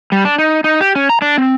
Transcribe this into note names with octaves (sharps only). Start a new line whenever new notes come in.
G3
D4
D#4
D#4
G4
C#4
A#5
D4
C4